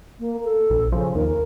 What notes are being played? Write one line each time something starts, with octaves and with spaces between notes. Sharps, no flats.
A#3
A4
A#1
C#3 F3
D#2 A#4